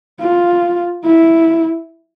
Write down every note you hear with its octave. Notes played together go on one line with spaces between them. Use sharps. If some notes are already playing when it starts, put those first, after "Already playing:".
F4
E4